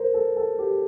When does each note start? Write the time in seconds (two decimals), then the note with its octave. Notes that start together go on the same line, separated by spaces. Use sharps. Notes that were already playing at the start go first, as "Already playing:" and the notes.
Already playing: A#4 C5
0.14 A4
0.36 A4
0.59 G4